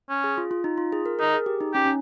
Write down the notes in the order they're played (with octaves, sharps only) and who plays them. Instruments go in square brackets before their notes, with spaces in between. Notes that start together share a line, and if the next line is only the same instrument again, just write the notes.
[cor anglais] C#4
[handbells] G#4
F4
F4
D#4
F4
G#4
A#4
[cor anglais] D#4 [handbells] A#4
[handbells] G#4
G4
D#4
[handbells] C#4 [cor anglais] G4
[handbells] C#4